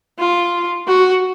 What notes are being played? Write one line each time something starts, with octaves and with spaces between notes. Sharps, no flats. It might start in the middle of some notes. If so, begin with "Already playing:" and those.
F4
F#4